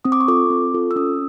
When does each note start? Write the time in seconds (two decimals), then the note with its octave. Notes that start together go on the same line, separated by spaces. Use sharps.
0.05 C4 D#6
0.12 D6
0.20 C#6
0.28 F4 A4 D6
0.50 C4
0.74 F4 A4
0.91 E6
0.96 C#4 D#6